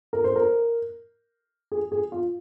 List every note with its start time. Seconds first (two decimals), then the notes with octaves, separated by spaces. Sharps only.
0.13 A#4
0.24 C5
0.36 A#4
1.72 G#4
1.92 G#4
2.12 F4